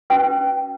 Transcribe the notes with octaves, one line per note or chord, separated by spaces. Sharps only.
C#4 F#4 B4 G5